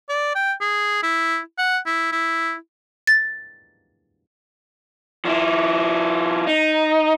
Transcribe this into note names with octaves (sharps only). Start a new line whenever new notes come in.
D5
G5
G#4
E4
F#5
E4
E4
A6
F3 E4
D#4